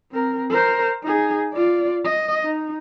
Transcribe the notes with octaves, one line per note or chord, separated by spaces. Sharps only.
C4 A#4
A#4 C5
D#4 G#4
F4 D5
D#5
D#4